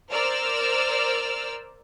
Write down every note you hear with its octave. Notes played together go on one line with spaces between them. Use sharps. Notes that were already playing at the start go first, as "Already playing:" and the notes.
A#4 C5 D5 E6 F6